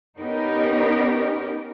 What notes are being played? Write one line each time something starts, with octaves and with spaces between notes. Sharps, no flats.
B3 C#4 D#4 G4 A#4